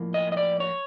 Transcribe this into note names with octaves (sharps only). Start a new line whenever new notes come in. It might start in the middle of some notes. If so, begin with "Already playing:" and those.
Already playing: A2 F3 A#3
D#5
D#5
D5
C#5